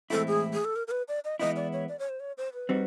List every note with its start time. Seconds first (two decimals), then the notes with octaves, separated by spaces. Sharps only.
0.10 A2 E3 G#3 C4 E4 A4
0.27 G#4
0.53 G#4
0.65 A4
0.76 A#4
0.87 A#4
0.91 B4
1.08 D5
1.25 D#5
1.39 E3 G#3 B3 E4 D#5
1.56 D5
1.73 C#5
1.88 D5
1.99 C#5
2.09 C5
2.20 C#5
2.37 C5
2.53 B4
2.69 G3 C4 D#4 F#4